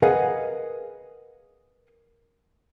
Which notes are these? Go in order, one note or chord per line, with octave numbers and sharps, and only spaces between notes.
G#4 A#4 B4 D#5 F5 F#5